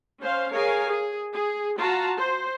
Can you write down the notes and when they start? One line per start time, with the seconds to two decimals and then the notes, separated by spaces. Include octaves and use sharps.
0.21 C#4 C5 F5
0.52 G#4 A#4 C#5 F5 G#5
0.88 G#4
1.32 G#4
1.76 F4 F#4 A5 A#5
2.16 C5